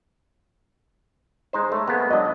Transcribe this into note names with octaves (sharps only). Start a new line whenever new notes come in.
G#3 D#4 C5
A3 C#5
G#3 A#3 B3
F#3 D4 D#5